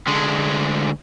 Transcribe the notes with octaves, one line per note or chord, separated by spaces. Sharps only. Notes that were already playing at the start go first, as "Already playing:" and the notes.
D2 G#3